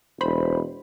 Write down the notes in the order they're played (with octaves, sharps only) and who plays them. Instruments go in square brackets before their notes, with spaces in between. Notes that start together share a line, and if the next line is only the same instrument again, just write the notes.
[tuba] E1 [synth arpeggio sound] C5 B5